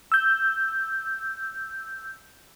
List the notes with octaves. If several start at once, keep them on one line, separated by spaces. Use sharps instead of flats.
E6 G6